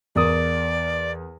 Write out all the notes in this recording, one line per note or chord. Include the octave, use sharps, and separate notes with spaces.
E2 A#4 D5 D#6